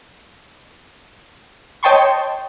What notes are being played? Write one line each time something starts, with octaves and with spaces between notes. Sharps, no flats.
C#5 D#5 G5 A5 C6 C#6